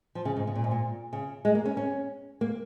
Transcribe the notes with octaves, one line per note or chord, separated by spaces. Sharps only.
F3
C#3
G#2
C#3
A#2
G#2
A#2
C#3
G#3
A#3
C#4
C#4
A#3